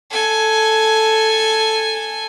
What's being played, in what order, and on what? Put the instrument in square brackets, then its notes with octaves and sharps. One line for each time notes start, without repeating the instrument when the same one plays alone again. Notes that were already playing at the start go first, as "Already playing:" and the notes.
[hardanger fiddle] A4 G#5